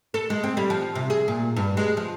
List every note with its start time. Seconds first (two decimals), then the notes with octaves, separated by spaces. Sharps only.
0.14 A4
0.30 G#3
0.43 C4
0.57 G3
0.70 F3
0.95 C3
1.10 G#4
1.28 A#2
1.56 G2
1.77 G#3
1.97 F3